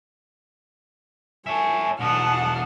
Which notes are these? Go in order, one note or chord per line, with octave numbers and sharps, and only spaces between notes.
C#5 E5 G#5 A5
E2 B2 F#5 A5 D#6 F6